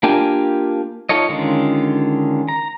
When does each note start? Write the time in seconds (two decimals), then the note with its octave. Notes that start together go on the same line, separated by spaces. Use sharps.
0.03 A#3 D4 F4 G4 G#5
1.09 D#4 F4 A4 C#5 D#5
1.29 D3 D#3 G#3 C#4 F4
2.48 A#5